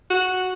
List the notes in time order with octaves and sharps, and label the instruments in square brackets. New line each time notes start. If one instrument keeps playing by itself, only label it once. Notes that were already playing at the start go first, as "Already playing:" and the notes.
[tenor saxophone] F#4